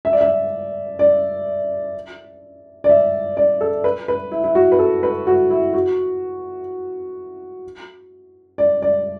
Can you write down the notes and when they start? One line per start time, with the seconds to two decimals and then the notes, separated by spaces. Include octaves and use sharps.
0.05 E5
0.13 D5
0.21 E5
0.99 D5
2.84 D5
2.89 E5
3.37 D5
3.61 A4
3.84 B4
4.08 B4
4.31 E4
4.44 E4
4.55 F#4
4.72 B4
4.79 A4
5.03 B4
5.27 F#4
5.50 E4
5.74 F#4
8.58 D5
8.82 D5